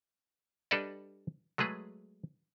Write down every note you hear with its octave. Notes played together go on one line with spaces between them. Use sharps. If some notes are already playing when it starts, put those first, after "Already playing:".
G3 D4 A4 B4 D5 D#5
F#3 G#3 A3 G#4 B4